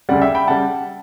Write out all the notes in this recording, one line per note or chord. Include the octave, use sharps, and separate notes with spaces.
D2 C#3 G3 D5 F#5
E5 G5
G5 B5
C#3 G3 F#5 A5